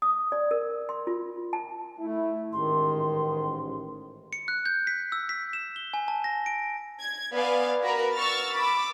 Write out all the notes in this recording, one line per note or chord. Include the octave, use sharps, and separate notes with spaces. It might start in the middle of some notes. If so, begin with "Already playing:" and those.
D#6
D5
A#4
C6
F4
A5
A3 E4
A1 G#2 D#3 C6
C#7
F#6
G6
B6
E6
B6
E7
G7
G#5
A5
A#6
D7
G#6
B3 D5 F5 G#5
F#4 A#4 B4 A#5
C#6 E6 F6 A6
B5 D6 E6